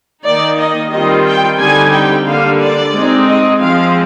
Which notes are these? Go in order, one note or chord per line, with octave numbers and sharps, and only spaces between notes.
D#3 A#3 D#4 D5
D#5
D#3 G3 C4 F4 D#5
G5
D3 G3 C4 D#4 G#5
G5
D3 G3 A#3 F5
D5
G#3 C4 D#4
D#5
F3 G#3 C4 F5